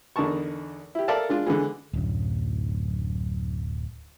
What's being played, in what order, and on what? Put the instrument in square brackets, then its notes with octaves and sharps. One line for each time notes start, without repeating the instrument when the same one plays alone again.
[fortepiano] E2 D3 D#4 A#4 A5 C#6
E4 G4
A4 A#4 D5 E5 F5 A5
G#3 D4 F4
D3 E3 G#3
[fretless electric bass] D1 F#2